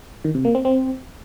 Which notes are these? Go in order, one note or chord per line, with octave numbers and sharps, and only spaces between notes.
D#3
C3
A#3
C4
C4